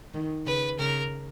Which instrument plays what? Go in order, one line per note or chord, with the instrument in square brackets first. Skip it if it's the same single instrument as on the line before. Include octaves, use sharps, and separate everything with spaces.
[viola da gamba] D#3
[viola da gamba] C#3 [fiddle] B4
[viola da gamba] C#3 [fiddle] A#4